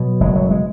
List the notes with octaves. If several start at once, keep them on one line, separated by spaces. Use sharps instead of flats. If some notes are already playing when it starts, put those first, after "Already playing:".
Already playing: B2 F#3
F#1 G#3
F#3
G#3